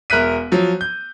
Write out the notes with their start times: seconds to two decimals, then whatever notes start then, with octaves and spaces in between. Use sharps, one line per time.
0.10 E1 A#4 E5 F#6 B6 D#7
0.52 F3 F#3
0.81 G6